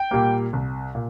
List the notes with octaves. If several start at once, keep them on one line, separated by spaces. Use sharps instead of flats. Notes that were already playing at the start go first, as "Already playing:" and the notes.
Already playing: G5
A#2 G3 A#3
C2
A#2